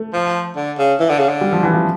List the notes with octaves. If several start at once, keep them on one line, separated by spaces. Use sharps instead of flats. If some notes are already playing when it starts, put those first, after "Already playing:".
Already playing: A3
F3
D3
C#3
E3
D3
C#3
D3
G3
F3
E3
F3